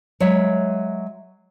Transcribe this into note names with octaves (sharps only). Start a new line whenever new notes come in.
F#3 G#3 C#5 E5